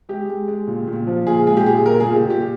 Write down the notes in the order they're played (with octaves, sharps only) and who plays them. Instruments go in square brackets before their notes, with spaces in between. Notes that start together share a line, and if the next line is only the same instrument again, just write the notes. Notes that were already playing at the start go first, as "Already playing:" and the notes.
[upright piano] G#3 G4
G#3
G#3
A#2
A#2
F3
A#2 G#4
G#3 G#4
G4
A#2 G#4
A#2 A#4
A#2 G#4
G4
A#2
G4